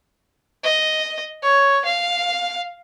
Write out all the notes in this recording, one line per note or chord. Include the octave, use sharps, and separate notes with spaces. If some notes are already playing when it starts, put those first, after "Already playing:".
D#5
C#5
F5